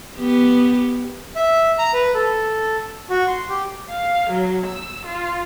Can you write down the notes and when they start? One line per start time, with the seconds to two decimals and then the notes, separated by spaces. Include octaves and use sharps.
0.18 B3 G4
1.36 E5
1.79 A#5
1.94 B4
2.14 A4
3.10 F#4
3.28 C6
3.49 G4
3.90 F5
4.30 F#3
4.65 E6
5.06 F4